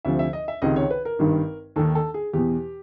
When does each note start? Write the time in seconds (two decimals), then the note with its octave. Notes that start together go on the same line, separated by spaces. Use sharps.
0.05 D2 C3 F3 E5
0.19 E5
0.33 D#5
0.48 E5
0.62 C#2 C3 D#3 D#5
0.76 C#5
0.91 B4
1.05 A#4
1.19 G#1 G2 D#3
1.76 D#2 D#3 A4
1.95 A4
2.14 G#4
2.33 E2 B2 G4